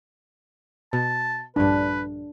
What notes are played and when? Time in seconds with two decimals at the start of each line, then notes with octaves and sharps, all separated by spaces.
0.93 B2 A5
1.56 A#1 G2 D4 B4